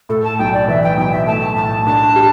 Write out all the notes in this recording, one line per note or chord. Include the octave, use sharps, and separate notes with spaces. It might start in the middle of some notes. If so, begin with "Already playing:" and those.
A2 A4
A5
B1 G5
D5
E3 E5
G5
B1 G5
E5
A3 A5
A2 A5
D4 A5
G4